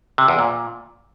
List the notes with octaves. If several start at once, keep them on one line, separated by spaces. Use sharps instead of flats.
C3
E2
A#2